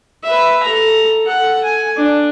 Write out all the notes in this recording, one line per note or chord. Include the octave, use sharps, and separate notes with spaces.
B4 E5
A4 A#5
A4 F#5
G#5
D4